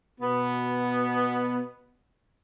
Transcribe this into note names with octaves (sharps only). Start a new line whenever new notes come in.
B2 B3